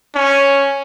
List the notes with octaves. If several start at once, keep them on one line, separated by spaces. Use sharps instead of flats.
C#4